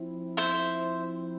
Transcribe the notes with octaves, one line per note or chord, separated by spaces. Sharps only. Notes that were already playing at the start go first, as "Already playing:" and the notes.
Already playing: F3 C4 E4
C5 E5